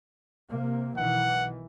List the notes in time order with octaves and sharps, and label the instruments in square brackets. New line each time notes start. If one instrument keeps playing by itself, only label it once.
[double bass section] C3 A#3
[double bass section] B1 D#3 E3 [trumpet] F#5